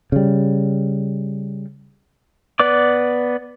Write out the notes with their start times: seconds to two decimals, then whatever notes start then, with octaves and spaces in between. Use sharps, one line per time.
0.12 C#3 G3
2.60 B3 B4 D5 D6